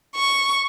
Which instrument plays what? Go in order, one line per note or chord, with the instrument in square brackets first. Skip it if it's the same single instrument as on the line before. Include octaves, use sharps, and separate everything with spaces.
[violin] C#6